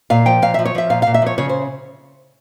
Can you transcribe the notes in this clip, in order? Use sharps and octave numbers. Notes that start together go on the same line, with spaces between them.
A#2 F5
F3 G5
A#2 F5
F3 E5
C#5
F3 E5
A#2 F5
A#2 F5
E5
F3 C#5
C#3 C#5
C5